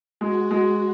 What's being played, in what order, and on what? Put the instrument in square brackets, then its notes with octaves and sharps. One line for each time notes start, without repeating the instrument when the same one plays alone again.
[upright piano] G#3 [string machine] F#4
[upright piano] G#3